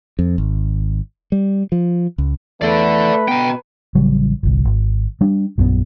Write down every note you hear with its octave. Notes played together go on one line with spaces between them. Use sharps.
F2
G#1
G3
F3
C#2
E2 A3 A4 B4 D5
B2 G5 A#5
A1 C#3 F#3 G3
G1 C2
G#1
G3 D4
A#1 F#2 C#3 B3